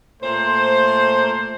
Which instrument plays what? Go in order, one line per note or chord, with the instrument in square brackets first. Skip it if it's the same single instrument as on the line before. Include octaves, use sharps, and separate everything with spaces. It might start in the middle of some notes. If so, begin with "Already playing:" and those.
[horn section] A#2 A3 C5